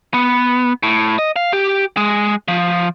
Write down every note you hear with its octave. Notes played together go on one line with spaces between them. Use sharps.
B3
A2
D#5
F5
G4
G#3
F3